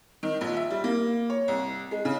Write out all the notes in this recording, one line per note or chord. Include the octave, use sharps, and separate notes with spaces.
D#3
A#1
E5
G3
A#3
C#5
C2
G#3
C#3